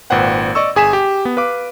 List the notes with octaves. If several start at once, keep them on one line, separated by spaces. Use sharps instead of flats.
G#1 A#2 B4 C5 F#5 G5
D5 D#5 C#6 E6
G1 G#4 G#5 B6 E7
G4
B3
B4 F5 D6